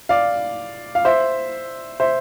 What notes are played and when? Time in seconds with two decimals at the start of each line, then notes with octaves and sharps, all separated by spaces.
0.09 D5 F5
0.95 F5
1.05 C5 E5
2.00 C5 E5